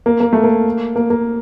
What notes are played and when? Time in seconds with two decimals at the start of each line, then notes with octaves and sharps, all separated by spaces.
0.06 A#3
0.20 A#3
0.33 A3
0.44 A#3
0.96 A#3
1.10 A#3